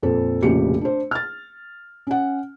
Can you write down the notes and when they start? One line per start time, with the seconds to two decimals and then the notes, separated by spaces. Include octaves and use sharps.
0.03 F2 A#2 A4 C5
0.43 F1 A#1 C#3 F#4 G4 C#7
0.81 D4 C5
1.11 F6 A6
2.07 C#4 F#5